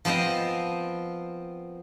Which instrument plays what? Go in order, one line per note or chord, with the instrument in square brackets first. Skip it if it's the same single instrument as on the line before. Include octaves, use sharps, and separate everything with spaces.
[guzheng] F3 B3 C4 C5 D#5